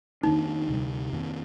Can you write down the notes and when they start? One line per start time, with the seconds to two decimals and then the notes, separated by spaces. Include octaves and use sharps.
0.23 F2 D#3 A#3 D4 D#4
0.68 D2 C3 G3
1.13 F2 D#3 A#3